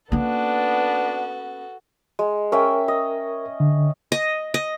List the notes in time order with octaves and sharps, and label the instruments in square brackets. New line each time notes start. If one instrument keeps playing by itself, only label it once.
[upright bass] A#3 C#4 [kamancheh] B3 [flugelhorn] D4 [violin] F#4 A4
[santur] G#3
[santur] C#4 E5 G5 [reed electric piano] A#4
[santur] D#5
[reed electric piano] D3
[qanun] D#5
D#5